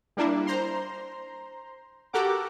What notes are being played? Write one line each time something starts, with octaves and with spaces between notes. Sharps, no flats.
G3 A#3 D4 E4
C5 A#5 C6
F#4 G4 A4 A#4 F#5 D6